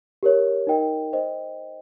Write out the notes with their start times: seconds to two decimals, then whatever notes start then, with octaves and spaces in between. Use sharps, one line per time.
0.23 G4 A#4 C#5
0.67 D#4 A#4 D#5 G5
1.13 C5 D#5 G5